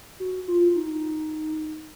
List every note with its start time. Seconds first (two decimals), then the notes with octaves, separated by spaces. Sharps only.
0.20 F#4
0.48 F4
0.76 D#4